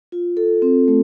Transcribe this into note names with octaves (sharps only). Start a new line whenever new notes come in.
F4
A4
C4
A3